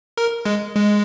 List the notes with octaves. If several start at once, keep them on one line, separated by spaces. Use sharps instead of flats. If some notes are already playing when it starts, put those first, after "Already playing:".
A#4
G#3
G#3